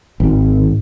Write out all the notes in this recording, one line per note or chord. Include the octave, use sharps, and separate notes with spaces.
G#1